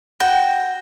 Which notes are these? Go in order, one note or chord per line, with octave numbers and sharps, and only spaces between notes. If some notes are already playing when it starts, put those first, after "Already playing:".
F#4 G5